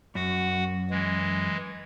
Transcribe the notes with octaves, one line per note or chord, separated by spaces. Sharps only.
F#2 F#4 F#5
E3 G#3